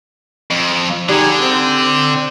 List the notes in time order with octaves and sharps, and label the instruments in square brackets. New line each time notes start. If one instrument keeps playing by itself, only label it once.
[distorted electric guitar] F2
[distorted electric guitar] D3 [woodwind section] G3 D#4 G#4
[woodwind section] C4